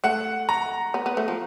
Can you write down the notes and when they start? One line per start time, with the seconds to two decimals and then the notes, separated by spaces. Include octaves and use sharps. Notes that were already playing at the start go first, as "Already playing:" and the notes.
0.04 A3 F#5
0.49 A#5
0.94 B3
1.06 B3
1.17 A3
1.28 F3